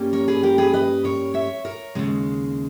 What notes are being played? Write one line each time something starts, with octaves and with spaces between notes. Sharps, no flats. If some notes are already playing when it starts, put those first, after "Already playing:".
Already playing: G2 G3 A#3 C#4
A#4 C#5
G#4 B4
G4 A#4
G#4 B4
B4 D#5
A#4 C#5
C#5 E5
A#4 C#5
D#2 C#3 G#3